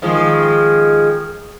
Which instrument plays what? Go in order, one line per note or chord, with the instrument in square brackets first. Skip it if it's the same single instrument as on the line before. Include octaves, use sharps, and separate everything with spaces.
[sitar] D#3 F3 G#3